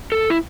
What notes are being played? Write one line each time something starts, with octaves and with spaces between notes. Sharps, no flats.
A4
E4